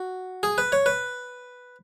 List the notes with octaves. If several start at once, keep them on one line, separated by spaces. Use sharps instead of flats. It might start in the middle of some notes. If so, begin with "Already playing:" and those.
Already playing: F#4
G#4
B4
C#5
B4